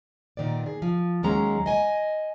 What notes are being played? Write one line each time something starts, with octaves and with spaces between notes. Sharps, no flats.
A#2 D#3 B3 D5
G#4
F3
D#2 F#3 G#3 C#4 A#5
D#5 G#5